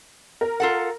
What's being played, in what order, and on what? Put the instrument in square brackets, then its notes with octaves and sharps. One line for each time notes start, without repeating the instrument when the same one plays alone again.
[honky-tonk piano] A#4
[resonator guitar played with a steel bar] F4 A4 F#5